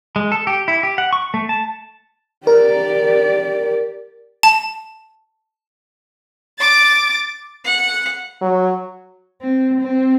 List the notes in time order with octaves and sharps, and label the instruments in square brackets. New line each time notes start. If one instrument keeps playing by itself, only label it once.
[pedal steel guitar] G#3
A4
G4
E4
G4
F#5
C#6
A3
A5
[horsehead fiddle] G4 D5 [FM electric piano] A#4
[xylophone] A5
[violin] D6 A6
[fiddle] F#5
[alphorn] F#3
[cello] C4
C4